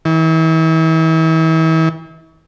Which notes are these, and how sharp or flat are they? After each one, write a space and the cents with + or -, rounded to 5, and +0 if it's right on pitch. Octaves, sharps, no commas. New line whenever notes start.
E3 -40